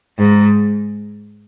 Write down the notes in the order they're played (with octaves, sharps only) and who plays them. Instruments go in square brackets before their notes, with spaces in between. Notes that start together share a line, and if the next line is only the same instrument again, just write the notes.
[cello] G#2